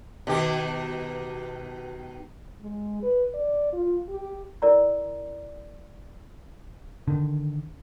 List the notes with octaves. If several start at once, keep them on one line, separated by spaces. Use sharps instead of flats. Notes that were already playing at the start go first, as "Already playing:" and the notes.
B2 D#3 G4
G#3
B4
D5
F4
G4
E4 A#4 D5 A#5
D3 D#3